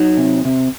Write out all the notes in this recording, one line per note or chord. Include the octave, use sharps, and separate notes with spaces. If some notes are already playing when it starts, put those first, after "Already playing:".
Already playing: F#3 D#4
C3
C3